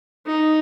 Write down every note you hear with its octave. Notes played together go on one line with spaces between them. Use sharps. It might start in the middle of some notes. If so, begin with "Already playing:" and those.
D#4